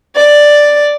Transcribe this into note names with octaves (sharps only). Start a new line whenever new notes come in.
D5